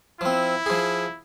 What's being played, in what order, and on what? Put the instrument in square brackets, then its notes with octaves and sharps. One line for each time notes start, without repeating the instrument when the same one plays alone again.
[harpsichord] F3 C4 [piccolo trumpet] E4
[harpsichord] F3 G#4